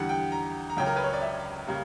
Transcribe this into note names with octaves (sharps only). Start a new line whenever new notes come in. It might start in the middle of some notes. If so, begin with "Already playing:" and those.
Already playing: E2 D3 G3 F#5
G5
A#5
A#5
C#2 C#3 F#3 C#4 G5
A#4
B4
C#5
D5
E5
C#3 G3 A#3